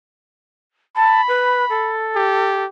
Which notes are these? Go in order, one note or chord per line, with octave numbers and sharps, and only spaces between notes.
A5 B5
B4
A4
G4